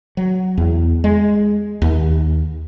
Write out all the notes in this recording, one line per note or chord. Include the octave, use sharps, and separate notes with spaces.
F#3
E2
G#3
D#2